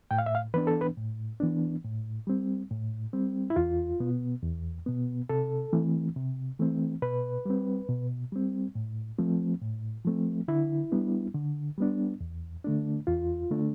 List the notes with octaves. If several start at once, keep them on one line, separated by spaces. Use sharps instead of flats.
A2 G5
F5
E5
F5
E3 B3 D4 B4
A4
B4
A2
E3 B3 D4
A2
G3 C4
A2
G3 C4
E4
E2 F4
B2 B3
E2
B2 B3
C3 A4
E3 A3 C4
C3
E3 A3 C4
B2 B4
G3 C4
B2
G3 C4
A2
F3 A3 C4
A2
F3 A3 C4
D3 E4
G3 B3 D4
D3
G3 B3 D4
E2
D3 A3 D4
E2 F4
D3 A3 D4